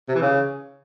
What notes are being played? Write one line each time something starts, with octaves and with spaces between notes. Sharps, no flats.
C3
E3
C#3